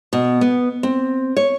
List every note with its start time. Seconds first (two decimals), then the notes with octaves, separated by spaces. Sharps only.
0.13 B2
0.41 B3
0.83 C4
1.37 C#5